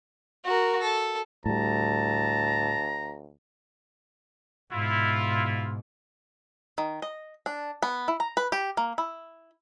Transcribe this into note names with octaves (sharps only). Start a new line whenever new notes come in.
F#4 A#4
A4
D2 A2 G3 A5 A#5
G#2 B2 E4 F4
D#3
D#5
D4
B3
E4
A#5
B4
G4
A#3
E4